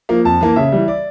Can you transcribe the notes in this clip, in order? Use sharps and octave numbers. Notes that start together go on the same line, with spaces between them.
F3 A#3
F2 A5
E3 A#3
C#3 E5
E3 G3
D5